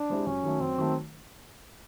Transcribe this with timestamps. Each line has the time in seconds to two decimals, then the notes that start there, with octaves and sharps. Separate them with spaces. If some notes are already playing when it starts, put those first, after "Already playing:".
Already playing: D4
0.10 G#3 C4 E4 G4
0.26 F#2 C#4
0.43 D#3 F#3 A3
0.61 F#2 C4
0.78 D#3 F#3 A3